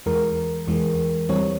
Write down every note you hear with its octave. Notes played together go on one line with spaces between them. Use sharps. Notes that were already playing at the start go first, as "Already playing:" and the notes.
E2 E3 G#3 A#4
E2 E3 G#3
E2 E3 G3 C4 C#5